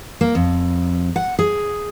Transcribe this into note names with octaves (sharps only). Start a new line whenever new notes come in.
A#3
F2
F#5
G#4